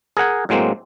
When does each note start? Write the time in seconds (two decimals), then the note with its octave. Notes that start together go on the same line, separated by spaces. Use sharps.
0.17 G#4 A#4 F#5 G#5
0.49 A2 F#3 G#3 A#3 C4